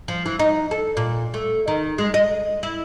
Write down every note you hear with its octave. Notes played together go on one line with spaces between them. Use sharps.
F3
E3
D#4
A4
A#2
A3
D#3
G#3
D#5
E4